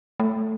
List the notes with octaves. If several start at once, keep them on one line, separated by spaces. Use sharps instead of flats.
A3